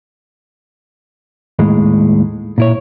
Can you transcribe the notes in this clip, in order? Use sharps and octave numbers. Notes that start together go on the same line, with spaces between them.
D#2 A2 G#3
A#2 E4 C#5